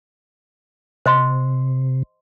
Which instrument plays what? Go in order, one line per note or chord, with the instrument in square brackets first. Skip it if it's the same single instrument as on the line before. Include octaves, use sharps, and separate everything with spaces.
[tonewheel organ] C3 [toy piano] C5 D#5 C6